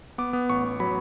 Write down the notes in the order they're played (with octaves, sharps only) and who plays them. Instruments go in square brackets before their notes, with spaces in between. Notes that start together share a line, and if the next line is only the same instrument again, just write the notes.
[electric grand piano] B3 D6
B3
A1 C#6
B3
F#3 B5